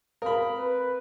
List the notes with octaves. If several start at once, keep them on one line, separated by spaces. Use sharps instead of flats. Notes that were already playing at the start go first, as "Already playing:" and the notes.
C4 A#4 F5 B5 D#6
B4